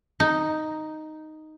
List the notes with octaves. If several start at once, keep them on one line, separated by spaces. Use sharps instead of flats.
D#4